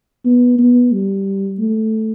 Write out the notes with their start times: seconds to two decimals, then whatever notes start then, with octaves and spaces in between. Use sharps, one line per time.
0.25 B3
0.58 B3
0.92 G3
1.59 A3